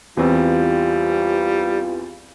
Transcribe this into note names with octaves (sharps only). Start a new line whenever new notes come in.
E2 E3 G3 C4 F4